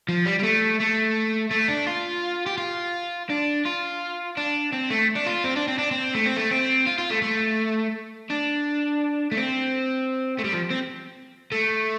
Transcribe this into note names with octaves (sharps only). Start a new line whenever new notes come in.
F3
G3
G3
A3
A3
A3
D4
F4
G4
F4
D4
F4
D4
C4
A3
D4
F4
C4
D4
C4
D4
C4
A3
C4
A3
C4
F4
F4
A3
A3
D4
A3
C4
A3
G3
F3
C4
A3